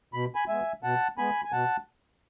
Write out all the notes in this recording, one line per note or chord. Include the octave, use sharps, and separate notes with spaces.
B2 B5
G#5 B5
G#3 B3 E5 G#5
B2 F#5 A5
G#3 B3 G#5 B5
G#5
B2 F#5 A5